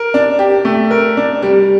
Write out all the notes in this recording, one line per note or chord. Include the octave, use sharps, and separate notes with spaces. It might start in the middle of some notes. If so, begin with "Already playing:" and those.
Already playing: A#4
D4
G4
A3
A#4
D4
G3